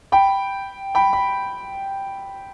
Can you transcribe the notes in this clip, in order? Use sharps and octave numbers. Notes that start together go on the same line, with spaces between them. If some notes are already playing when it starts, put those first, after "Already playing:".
G5 B5
G5 B5
B5